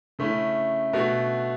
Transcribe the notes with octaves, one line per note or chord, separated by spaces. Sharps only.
C#3 A3 C#4 E4
B2 A3 F#4